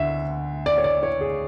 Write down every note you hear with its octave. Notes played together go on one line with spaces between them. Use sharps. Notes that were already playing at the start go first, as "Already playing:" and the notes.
Already playing: D2 D3 E5
D5
C#5
D5
C#5
G#4